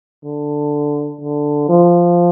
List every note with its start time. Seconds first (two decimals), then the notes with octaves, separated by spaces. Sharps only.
0.24 D3
1.21 D3
1.69 F3